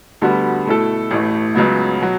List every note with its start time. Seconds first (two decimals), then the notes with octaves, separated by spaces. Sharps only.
0.22 D2 D3 G3 B3 F#4
0.66 B2 A3 E4 A4
1.11 A1 A2 E3 A3
1.55 C#2 C#3 F#3 B3
2.01 B2 F#3